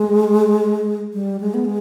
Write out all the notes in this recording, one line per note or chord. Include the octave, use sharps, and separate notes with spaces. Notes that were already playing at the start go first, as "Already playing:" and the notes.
Already playing: G#3
G3
G#3
B3
G#3